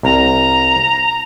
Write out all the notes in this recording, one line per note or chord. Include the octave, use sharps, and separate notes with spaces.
C2 A#5